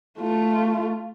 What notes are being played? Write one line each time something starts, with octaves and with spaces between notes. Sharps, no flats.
A3 F4